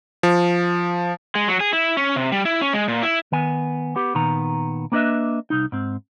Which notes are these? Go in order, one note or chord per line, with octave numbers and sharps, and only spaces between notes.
F3
G#3
F#3
G#4
E4
C#4
C3
G3
E4
C#4
G#3
A#2
E4
D#3 B3 G#5
B3 G4
A#2 D#3 B3 A#5
A#3 B3 D4 B4 D#5 E5
C2 D#4
G#2 C4